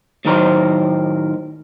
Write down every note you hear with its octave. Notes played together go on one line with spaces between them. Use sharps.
A2 D#3 F#3 A#4 C5